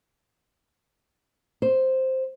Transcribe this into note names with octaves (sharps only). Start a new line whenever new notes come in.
C5